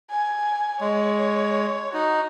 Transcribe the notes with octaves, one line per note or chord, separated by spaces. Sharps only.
G#5
G#3 C#5
D#4 F#4